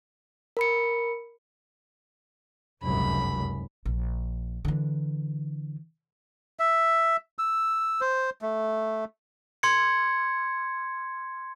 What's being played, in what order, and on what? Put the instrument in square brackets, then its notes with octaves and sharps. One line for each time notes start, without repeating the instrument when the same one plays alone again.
[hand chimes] A#4 B5 C#7
[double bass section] F1 C#2 F#2 [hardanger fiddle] B5
[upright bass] A#1
D3 E3
[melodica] E5
E6
C5
A3
[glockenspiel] C6 G#6 C#7